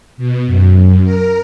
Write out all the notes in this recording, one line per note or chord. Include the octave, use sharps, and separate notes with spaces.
B2
F#2
A#4